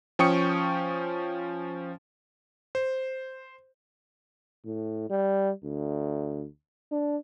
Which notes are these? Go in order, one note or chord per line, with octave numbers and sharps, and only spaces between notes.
F3 C#4 G5 C#6 D#6 C#7
C5
A2
G3
D2
D4